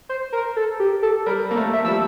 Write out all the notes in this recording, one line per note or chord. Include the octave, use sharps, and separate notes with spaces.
C5
A#4
A4
G4
A4
G3 A#4
A#3 A4
A3
E5
F3 G3 E6